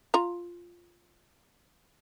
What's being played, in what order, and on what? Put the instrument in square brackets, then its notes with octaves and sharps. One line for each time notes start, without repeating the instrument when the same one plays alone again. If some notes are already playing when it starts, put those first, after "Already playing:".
[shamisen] F4 A#5